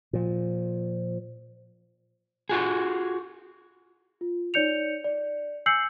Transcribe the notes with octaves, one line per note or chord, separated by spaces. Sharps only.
A#2 F3
F4 F#4 G#4
F4
D#4 C#5 D5 G6 C#7 F7
D5
G#5 E6 G6 C7 C#7 F#7